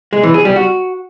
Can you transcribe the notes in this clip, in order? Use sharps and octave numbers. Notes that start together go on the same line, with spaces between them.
G#3
E3
G#4
G3
F#4